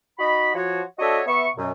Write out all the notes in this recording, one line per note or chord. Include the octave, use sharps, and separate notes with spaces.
D#4 F#4 D#5 B5
F3 F#4 C#5
D4 F#4 A4 C#5 D#5 E5
B3 E5 C#6
F#2 B2